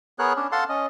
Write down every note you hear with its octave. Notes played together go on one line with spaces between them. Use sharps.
B3 G#4 A#4 C#5 F#6
C#4 D4
A4 F5 F#5 A5 C6
C#4 D#5